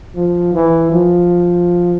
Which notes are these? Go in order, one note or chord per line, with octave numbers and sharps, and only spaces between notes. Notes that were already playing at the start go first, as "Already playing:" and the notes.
F3
E3
F3